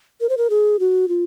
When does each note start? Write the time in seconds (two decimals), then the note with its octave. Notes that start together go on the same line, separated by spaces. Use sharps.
0.21 A#4
0.29 C5
0.38 A#4
0.50 G#4
0.80 F#4
1.08 F4